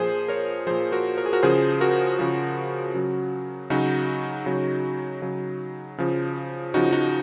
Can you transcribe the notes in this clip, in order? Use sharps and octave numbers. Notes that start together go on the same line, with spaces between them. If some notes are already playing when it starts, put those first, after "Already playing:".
Already playing: A#2 F3 G#4 C5
A#4 C#5
A#2 F3 G#4 C5
F#4 A#4
A#4
G#4
F#4 A#4
C#3 F3 G#4 C5
F#4 A#4
C#3 F3
C#3 F#3
C#3 F#3 D#4 F#4
C#3 F#3
C#3 F#3
C#3 F3
C#3 F3 D#4 F#4
D#4 F#4